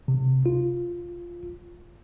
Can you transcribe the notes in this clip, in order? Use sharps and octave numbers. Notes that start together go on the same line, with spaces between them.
C3
F4